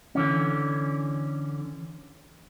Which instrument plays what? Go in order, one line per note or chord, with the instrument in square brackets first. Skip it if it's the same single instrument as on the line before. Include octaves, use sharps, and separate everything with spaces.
[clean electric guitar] D3 E3 C#4